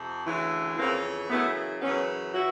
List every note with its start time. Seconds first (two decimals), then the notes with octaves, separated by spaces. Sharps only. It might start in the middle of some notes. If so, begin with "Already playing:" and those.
Already playing: F2 C3
0.25 D2 C#3 E3
0.78 F2 C#3 E3 A#3 C4
1.29 F#2 C#3 E3 A3 B3
1.81 F#2 C#3 E3 B3 C#4
2.34 E3 E4 F#4